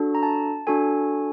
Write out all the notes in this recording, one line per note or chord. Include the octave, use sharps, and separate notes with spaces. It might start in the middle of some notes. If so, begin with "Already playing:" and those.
Already playing: D4 F#4 A4
A#5
A5
D4 F#4 A4 G#5